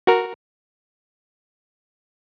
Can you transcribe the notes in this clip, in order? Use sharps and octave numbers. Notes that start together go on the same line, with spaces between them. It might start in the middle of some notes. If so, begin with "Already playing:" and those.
F#4 A#4